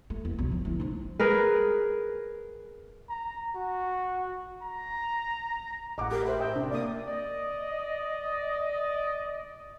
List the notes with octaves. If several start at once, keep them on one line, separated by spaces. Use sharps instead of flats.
A3
E2
B1
D3 F3
D2 E4
F3 D#4
G#4 A#4 B4
A#5
F#4
A#5
A1 A2 D#5 F#5 A#5 D6
G4 A#4
C5 E5 B5
D#5 G5 E6
C3 D4
A#3 D5 D#6
D5 D#5